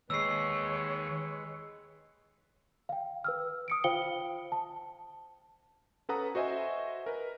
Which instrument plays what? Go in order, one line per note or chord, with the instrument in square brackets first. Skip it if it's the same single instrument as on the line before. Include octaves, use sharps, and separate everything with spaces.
[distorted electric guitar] D#2 [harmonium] G#3 B4 [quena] C#5 [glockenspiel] E6 C7
[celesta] F5 G5
B4 E6 F6
D#6 C#7 D7
F4 C5 F5 G5 C#7 G7
A5
[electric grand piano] C#4 A4 B4 F#5 A#5 D#6
F#4 C5 D#5 E5 G#5
A#4 B4